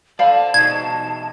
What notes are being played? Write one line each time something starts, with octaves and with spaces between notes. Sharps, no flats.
A4 C5 D5 F5 A5 B5
B2 D#4 G#4 G#6